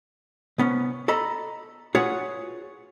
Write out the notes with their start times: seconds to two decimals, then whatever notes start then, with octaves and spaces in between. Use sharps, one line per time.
0.58 C2 B3 C#4
1.08 A4 D#5 A#5 B5
1.95 F4 F#4 G#4 B4 C#5 F#5